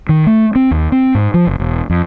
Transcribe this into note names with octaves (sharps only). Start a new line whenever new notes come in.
D#3
A3
C4
D#2
C4
G#2
F3
F#1
E1
F2